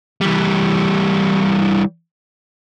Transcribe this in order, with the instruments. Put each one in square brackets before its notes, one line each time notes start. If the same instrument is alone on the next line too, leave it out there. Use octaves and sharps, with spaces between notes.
[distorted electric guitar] E3 G3